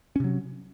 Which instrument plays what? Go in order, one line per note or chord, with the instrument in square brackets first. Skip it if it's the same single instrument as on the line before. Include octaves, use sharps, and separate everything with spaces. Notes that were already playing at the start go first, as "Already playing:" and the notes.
[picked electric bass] C#4
C3
F#3